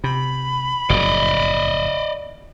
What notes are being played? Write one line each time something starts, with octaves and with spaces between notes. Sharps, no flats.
C3 B5
F#1 F2 A2 D5 D#5